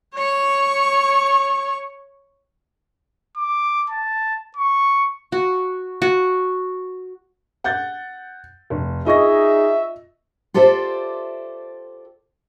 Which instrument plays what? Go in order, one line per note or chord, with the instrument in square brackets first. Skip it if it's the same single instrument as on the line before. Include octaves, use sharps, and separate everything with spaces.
[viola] C#5 C#6
[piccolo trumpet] D6
A5
C#6
[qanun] F#4
F#4
[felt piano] F#5 G6 A6
F1
[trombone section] D#4 G#4 [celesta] F4 C#6 [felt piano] D#5 A#6 [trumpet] E5
[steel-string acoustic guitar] F4 G4 A4 C5 D5 E5